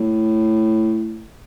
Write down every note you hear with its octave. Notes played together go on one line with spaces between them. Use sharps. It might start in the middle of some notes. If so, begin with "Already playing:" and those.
Already playing: A2